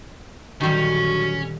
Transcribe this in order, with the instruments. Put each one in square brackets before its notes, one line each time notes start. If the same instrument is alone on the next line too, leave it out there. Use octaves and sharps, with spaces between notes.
[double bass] A#1 D3 [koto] D#3 G3 [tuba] F#3 [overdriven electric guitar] C#4